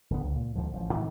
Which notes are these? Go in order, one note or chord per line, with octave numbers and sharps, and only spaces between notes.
D1 D3 B3
C#2
A#2
D2 G#2 F3
A1 F3
A2 D#3 A3 C4